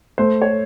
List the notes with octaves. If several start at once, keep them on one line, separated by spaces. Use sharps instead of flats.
A3 C5
C#5